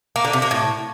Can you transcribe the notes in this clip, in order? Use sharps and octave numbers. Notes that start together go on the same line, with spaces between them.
A#3
D3
C3
A#3
A2